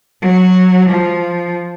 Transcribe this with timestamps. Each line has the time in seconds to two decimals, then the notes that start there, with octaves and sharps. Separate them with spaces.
0.22 F#3
0.89 F3